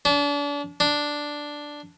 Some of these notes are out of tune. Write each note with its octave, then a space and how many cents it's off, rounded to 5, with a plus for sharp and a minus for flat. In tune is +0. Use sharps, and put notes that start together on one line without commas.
D4 -35
D4 +0